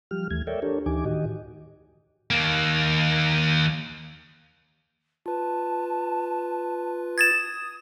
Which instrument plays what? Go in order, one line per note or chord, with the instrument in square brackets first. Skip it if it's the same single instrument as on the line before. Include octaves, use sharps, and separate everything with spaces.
[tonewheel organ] F3 G3 G4 F6
D#2 E3 A3 G#6
A4 A#4 C#5 D5 E5 G5
D4 G4 A4 A#4 C#5
D2 E3 D#4 G4 G#5 D6
A2 D#3 F#4 G4 D#5
[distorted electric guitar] D#2 A#3
[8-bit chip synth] F4 B4 [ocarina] A5
[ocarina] D#6 [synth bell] G#6 A6 E7